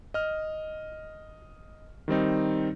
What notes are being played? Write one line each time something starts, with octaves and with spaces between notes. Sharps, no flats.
D#5 F6
D#3 G3 C4 D#4